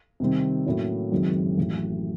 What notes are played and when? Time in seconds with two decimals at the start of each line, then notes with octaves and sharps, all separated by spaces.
0.20 C3 D#3 G3 C4
0.66 A2 F#3 A#3 C#4 E4
1.12 F#1 F#2 D#3 G#3 C4
1.57 A1 A2 F#3